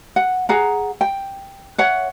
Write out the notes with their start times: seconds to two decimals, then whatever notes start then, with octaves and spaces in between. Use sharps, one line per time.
0.16 F#5
0.49 G#4 F#5 A#5
1.01 G5
1.78 C#5 E5 F#5